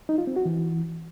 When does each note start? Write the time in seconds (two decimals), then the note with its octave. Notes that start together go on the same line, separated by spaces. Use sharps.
0.09 D#4
0.18 F4
0.27 C4
0.36 F#4
0.45 E3